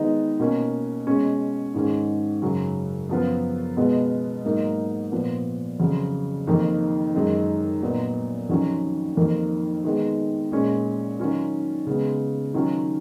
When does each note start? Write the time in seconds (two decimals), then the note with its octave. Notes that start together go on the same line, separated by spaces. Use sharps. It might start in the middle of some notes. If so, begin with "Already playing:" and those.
Already playing: D#3 G#3 B3 D#4
0.40 B2 A#3 C#4
1.07 B2 G#3 C#4
1.74 G#2 D#3 G#3 C#4
2.42 F#2 C#3 F#3 C#4
3.09 F#2 F3 B3 F4
3.77 B2 G#3 B3 F4
4.44 G#2 F#3 A#3 D#4
5.12 A#2 F3 B3
5.80 F2 C#3 F#3
6.47 F2 D#3 A#3 D#4
7.14 F#2 D#3 G#3 D#4
7.82 A#2 F#3 B3 D#4
8.49 F2 D#3 F#3 C#4 F4
9.17 F2 D#3 A#3
9.85 D#3 G#3 B3
10.52 A#2 G#3 C#4
11.19 D#3 F#3 C#4 F4
11.87 C#3 G#3 B3
12.54 D#3 F#3 C#4 F4